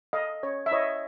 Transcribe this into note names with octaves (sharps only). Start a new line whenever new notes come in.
A4 D#5 F5
C#4 C#5
E5
E4 C#5 D#5